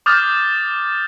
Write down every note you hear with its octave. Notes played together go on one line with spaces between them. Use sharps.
D6 D#6 F6 G6 A6